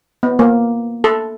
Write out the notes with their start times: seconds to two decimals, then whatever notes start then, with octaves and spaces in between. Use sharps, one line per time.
0.23 B3
0.39 A#3
1.04 A4